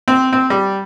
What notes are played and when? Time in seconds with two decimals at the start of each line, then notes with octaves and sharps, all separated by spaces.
0.08 C4
0.33 C4
0.50 G3